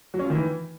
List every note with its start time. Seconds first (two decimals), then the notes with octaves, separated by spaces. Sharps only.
0.14 F#3
0.19 C#4
0.25 F4
0.30 D#3
0.35 E3